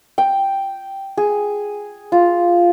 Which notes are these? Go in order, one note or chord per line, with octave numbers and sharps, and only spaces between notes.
G5
G#4
F4